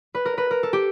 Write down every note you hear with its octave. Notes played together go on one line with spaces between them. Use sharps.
B4
A#4
B4
A#4
A4
G4